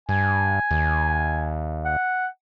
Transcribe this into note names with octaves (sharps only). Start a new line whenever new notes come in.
G2 G#5
D#2
F#5